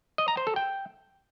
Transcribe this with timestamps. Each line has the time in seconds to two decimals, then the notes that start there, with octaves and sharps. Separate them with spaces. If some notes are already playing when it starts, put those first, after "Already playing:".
0.18 D#5
0.28 A#5
0.37 C5
0.47 A4
0.56 G5